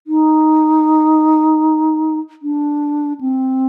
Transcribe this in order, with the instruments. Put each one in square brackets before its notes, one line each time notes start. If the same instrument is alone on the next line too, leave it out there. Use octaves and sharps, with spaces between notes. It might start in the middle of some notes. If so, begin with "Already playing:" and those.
[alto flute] D#4
D4
C4